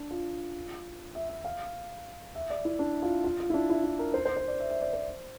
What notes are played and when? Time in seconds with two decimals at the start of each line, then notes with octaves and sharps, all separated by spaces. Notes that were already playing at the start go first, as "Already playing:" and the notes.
Already playing: D4
0.11 F4
1.15 E5
1.29 E5
1.45 F5
2.35 E5
2.50 D5
2.65 E4
2.79 D4
3.02 F4
3.24 F4
3.40 F4
3.50 E4
3.54 D4
3.70 E4
3.84 E4
3.99 A#4
4.14 C5
4.25 C5
4.37 C5
4.48 D5
4.60 E5
4.70 E5
4.82 D5
4.93 C5